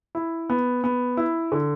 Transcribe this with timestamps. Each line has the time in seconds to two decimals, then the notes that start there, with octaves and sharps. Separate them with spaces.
0.15 E4
0.50 B3
0.84 B3
1.17 E4
1.52 D3